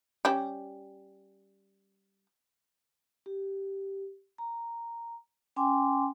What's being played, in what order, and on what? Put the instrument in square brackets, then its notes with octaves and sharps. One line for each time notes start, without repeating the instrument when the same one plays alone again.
[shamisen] G3 C#4 G4
[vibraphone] G4
A#5
C#4 G5 G#5 C6 D6